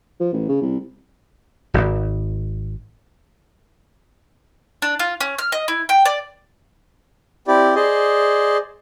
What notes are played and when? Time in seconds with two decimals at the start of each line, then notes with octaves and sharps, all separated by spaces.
0.20 F3
0.33 A1
0.49 C#3
0.62 C2
1.74 D1 G#1
4.82 D4
4.99 F4
5.21 C#4
5.38 F6
5.52 D#5
5.68 E4
5.89 G5
6.05 D5
7.48 C4 E4 G4 D5
7.75 G#4 C5 D5 D#5